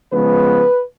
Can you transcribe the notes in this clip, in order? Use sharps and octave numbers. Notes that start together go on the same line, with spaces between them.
C#3 F3 G#3 B3 B4